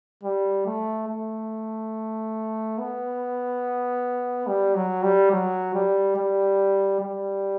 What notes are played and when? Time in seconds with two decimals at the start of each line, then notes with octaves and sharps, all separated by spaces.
0.23 G3
0.66 A3
1.08 A3
2.78 B3
4.47 G3
4.75 F#3
5.03 G3
5.32 F#3
5.74 G3
6.17 G3
7.01 G3